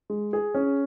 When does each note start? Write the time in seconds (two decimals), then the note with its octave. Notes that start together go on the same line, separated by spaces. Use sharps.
0.10 G#3
0.33 G#4
0.54 C#4